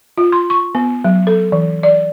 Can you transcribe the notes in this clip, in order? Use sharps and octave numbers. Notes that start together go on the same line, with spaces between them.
F4
C6
C#6
B3
F#3
A4
E3
D5